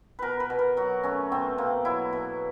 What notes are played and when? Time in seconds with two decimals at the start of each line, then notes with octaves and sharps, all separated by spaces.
0.19 B2 A#4 B4
0.40 B4
0.50 B2
0.59 A#4
0.77 F#3 F#4
1.03 A3 C#4
1.32 B2 C4
1.58 B2 A#3
1.85 F#3 E4
2.13 B2